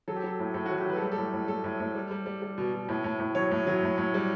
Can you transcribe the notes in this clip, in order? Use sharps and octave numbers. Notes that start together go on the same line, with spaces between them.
F#3 A4
G4
F#3 A4
A2
A2 A4
F#4
F#3
G4
F#3 B4
A4
G3 G4
A4
A2
A2
A2 A4
A2
A2
G3
G3
G3
G3
B2
B2
A2
A2
A2
F#3 C#5
A2
F#3
A2
A2
G3